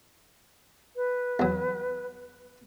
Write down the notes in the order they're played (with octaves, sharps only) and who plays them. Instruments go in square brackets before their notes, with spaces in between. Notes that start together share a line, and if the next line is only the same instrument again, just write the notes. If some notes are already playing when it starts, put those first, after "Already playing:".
[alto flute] B4
[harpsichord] E2 F#3